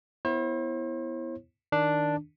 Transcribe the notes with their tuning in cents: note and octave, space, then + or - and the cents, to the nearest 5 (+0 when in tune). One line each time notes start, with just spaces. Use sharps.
B3 +0 E4 +0 C5 +45
D#3 +0 D4 +0